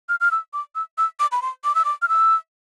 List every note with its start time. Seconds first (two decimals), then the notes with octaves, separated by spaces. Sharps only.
0.09 F6
0.21 F6
0.31 E6
0.53 D6
0.75 E6
0.98 E6
1.20 D6
1.32 B5
1.42 C6
1.64 D6
1.75 E6
1.85 D6
2.02 F6
2.09 E6